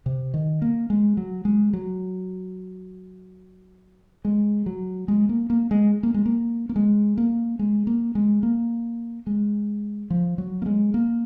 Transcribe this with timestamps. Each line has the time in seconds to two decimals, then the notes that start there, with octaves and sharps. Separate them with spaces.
0.06 C3
0.34 D#3
0.62 A#3
0.90 G#3
1.17 F#3
1.45 G#3
1.73 F#3
4.25 G#3
4.66 F#3
5.08 G#3
5.29 A#3
5.50 A#3
5.71 G#3
6.03 A#3
6.14 G#3
6.26 A#3
6.69 A#3
6.76 G#3
7.18 A#3
7.59 G#3
7.87 A#3
8.15 G#3
8.43 A#3
9.27 G#3
10.10 F3
10.38 F#3
10.62 A#3
10.66 G#3
10.94 A#3